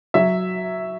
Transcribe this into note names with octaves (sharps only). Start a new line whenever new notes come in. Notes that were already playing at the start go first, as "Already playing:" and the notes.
F#3 E5